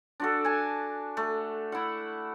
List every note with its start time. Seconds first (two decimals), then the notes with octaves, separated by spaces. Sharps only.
0.20 D4 F#4 A4
0.45 G#5 A5
1.17 A3
1.72 E4 F#5